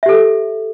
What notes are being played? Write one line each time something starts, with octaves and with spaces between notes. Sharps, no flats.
G4 A4 E5